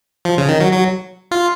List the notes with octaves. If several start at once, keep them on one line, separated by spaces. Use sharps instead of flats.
F3
C#3
D#3
F#3
F#3
F4